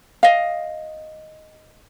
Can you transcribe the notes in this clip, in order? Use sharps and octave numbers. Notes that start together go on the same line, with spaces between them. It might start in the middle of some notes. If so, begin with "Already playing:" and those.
D#5 F5